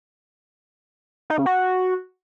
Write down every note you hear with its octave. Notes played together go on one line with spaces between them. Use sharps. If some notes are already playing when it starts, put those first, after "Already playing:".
D#4
C#3
F#4